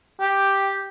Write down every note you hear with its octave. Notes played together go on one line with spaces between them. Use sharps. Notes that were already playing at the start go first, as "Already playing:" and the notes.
G4